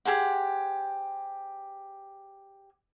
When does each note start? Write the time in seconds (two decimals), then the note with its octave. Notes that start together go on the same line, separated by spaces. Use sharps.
0.05 G4 G#4 C5 F#5